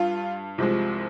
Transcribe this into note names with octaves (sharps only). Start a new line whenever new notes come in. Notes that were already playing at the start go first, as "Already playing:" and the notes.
Already playing: G2 F4
C2 C3 F3 G#3